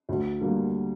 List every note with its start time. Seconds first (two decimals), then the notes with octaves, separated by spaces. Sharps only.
0.09 D2
0.41 D3 G3 A#3